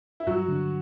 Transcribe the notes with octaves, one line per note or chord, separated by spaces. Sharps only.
E4
G2 F#3 F#4
D3